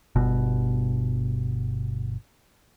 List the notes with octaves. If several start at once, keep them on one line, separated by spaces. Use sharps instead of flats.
G1 B2